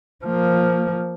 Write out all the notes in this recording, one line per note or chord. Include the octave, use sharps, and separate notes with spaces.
F3 A#3